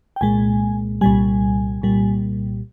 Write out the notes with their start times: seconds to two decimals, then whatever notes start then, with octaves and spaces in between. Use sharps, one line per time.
0.16 G5
0.21 C2 A#2 G#3 G#5
1.01 C2 A#2 G3 G#5
1.82 C2 A#2 G3